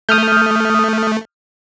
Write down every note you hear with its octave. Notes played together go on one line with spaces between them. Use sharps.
A3 D#6 F6 G6